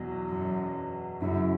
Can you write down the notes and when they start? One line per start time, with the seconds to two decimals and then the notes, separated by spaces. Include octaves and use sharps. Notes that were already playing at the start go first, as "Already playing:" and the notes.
Already playing: E2 B2 F#3
0.29 F#2
1.21 F#2 C#3 F#3 C#4 E4